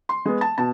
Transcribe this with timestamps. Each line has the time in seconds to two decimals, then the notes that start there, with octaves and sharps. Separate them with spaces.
0.09 C6
0.25 G#3 B3
0.41 A5
0.58 B2 A5